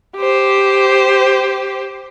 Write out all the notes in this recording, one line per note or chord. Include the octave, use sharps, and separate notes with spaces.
G4 C5